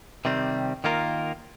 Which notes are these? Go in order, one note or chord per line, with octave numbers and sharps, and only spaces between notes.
C3 D#3 G3 C4
D#3 A#3 F4 A#4